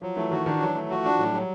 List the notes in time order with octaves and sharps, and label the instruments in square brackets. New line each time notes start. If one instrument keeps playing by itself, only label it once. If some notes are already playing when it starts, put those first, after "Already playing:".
[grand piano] F3 [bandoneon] F#3
[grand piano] E3 [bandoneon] A3
[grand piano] D#3 [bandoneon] F#4
[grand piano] D#3 [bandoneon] D4
[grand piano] E3 [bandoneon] F#3
[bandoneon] A3
[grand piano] F3 [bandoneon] F#4
[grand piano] F3 [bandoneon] D4
[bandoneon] A2 [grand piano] F#3
[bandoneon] F#3 [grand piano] G3